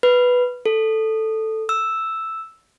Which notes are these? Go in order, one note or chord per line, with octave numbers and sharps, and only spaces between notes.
B4
A4
E6